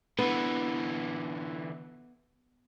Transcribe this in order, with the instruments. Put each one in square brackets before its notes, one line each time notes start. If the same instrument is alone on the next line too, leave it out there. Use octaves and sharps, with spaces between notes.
[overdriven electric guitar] D3 E3 [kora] B3